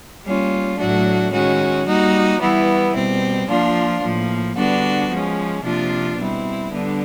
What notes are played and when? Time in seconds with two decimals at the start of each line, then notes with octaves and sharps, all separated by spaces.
0.23 G3 A#3 C#4 F4
0.78 A2 F#3 A3 D4 F#4
1.31 D#3 G#3 C#4 F#4
1.85 G3 A#3 D#4 F#4
2.39 E3 G3 B3 E4
2.94 B2 G3 C4
3.48 F3 A#3 D4 F4
4.01 A2 F3 A#3
4.55 D3 G3 B3 D4 F#4
5.10 F3 G#3 C#4
5.63 C3 F3 A#3 D4 F4
6.17 B2 G3 C4 E4
6.71 D3 G3 B3 D4